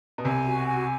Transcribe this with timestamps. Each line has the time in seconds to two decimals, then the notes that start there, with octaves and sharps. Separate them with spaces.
0.18 B2
0.24 C2 C3 G#5
0.46 F#4
0.66 G#5